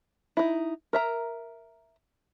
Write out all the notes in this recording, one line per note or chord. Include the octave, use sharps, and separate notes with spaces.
D#4 E4
A#4 E5 A#5